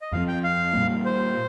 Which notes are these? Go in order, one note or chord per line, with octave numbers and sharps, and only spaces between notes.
D#5
F2 F3 C4 F5
G5
F5
A#2 G3 A#3
C5